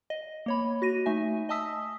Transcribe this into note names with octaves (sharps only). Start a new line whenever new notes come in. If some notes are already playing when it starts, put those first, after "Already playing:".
D#5
A#3 C#5 B5
F#4 A#6 D#7
A3 D#4 E5 G#5
D#5 G#5 A5 D#6 E6 B6